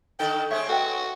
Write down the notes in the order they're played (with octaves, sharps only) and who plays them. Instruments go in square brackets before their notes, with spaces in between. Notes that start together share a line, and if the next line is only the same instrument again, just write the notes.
[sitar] D3 D#3 A4 [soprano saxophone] G5
[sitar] G#3 C4 C#4 [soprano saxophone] C#5 [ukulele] E5
[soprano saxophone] F#4 [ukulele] A4 B4 G5